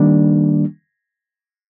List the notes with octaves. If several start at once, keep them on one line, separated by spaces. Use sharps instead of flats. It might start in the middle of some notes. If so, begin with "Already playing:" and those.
Already playing: D#3 G3 A#3 D4